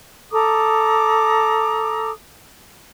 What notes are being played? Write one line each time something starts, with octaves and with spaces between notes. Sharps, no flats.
A4 A#5 D6 D#6